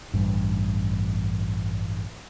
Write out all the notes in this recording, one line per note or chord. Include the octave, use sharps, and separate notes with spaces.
A1 G2